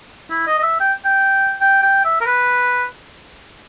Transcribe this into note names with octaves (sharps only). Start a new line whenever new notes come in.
E4
D#5
D#5
E5
G5
G5
G5
G5
E5
A#4
B4